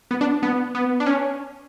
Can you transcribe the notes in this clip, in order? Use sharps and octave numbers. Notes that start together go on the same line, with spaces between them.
B3
D4
B3
B3
D4
C#4